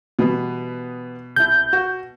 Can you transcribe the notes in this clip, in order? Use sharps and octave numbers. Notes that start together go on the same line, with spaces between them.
B2 E3 G3 B3
C2 E4 G6
F#4